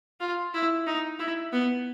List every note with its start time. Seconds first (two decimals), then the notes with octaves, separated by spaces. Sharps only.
0.20 F4
0.54 E4
0.87 D#4
1.19 E4
1.53 B3